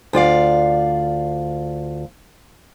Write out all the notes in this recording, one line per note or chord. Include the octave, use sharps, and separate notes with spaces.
D2 F4 D5 F5